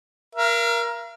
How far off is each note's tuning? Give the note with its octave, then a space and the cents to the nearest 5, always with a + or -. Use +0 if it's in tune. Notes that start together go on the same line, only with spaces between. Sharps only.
A#4 +15 F5 -45